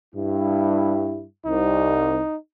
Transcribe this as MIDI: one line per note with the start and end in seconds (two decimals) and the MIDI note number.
0.14 1.22 43
0.14 1.22 64
1.46 2.19 36
1.46 2.36 63